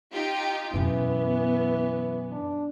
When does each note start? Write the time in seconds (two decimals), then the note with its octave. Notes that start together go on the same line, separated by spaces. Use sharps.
0.12 D#4 F4 G4
0.74 F#2 B2 E3 B3
2.32 D4